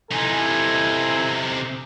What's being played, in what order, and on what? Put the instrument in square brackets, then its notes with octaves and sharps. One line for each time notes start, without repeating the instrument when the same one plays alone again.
[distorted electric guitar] C3 D#4 [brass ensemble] E4 A4 G#5